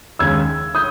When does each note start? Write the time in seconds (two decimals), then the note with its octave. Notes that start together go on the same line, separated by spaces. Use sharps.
0.19 D#2 C#3 G#3 E6 G#6
0.75 D#6 G6